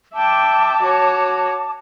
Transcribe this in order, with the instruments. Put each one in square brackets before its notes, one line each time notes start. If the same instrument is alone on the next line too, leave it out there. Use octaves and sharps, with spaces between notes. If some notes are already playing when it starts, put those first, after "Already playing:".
[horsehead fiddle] E5 G5 [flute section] A5 D6
[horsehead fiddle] F#4 C#5